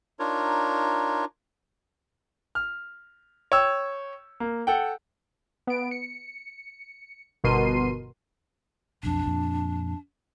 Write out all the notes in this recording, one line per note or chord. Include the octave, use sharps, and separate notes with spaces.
D4 D#4 F4 A#4 C#5
F6
C#5 G5 E6
A#3
A4 F#5 G5
B3 D7
C#7
G1 B2 A#4 C6 C7 D#7
B1 F2 D4
F2 A#2